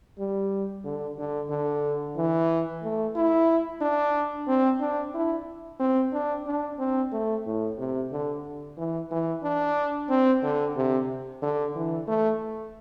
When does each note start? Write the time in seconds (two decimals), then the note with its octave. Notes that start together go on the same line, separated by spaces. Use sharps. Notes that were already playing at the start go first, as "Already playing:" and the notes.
0.19 G3
0.84 D3
1.18 D3
1.50 D3
2.16 E3
2.83 A3
3.16 E4
3.81 D4
4.47 C4
4.80 D4
5.14 E4
5.80 C4
6.13 D4
6.47 D4
6.79 C4
7.12 A3
7.46 A2
7.78 C3
8.12 D3
8.78 E3
9.11 E3
9.43 D4
10.09 C4
10.43 D3
10.76 C3
11.42 D3
11.76 E3
12.07 A3